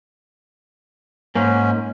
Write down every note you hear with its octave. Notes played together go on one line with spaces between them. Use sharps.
G#2 A#3 C#4